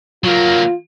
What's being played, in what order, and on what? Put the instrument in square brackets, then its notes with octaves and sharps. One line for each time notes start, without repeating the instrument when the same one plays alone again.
[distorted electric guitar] F#3 A#3 [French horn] F4